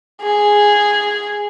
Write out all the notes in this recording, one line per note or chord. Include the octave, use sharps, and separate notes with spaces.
G#4